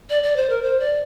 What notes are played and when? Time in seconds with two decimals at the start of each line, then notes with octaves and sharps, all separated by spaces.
0.09 D5
0.23 D5
0.36 C5
0.49 A#4
0.62 C5
0.80 D5